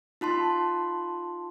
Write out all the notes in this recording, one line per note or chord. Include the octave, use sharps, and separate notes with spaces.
D#4 F4 A5 C6